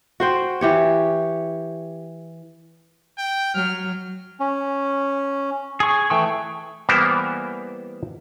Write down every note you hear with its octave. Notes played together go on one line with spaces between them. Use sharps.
F#4 C5 G5
E3 G4 C#5
G5
F#3 F6
C#4
G#4 C#6
E3 A3 G5 C#6
E3 G3 A#3 B3 A#4 C5